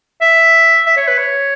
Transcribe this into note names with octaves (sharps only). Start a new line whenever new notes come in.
E5
E5
C#5
B4
C#5